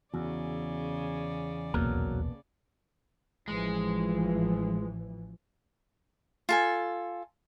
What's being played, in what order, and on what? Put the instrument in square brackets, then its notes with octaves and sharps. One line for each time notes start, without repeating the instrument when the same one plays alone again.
[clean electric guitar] E2 [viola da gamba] C#3 D5 [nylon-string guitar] F#4
[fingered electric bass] D#1 B1 E2 [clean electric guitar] F#3 A#4 [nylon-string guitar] A#3 B3 A4
[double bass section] A1 E3 F3 [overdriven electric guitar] G#3
[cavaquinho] F4 A4 G#5